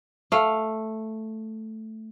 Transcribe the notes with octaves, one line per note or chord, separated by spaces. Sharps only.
A3 F5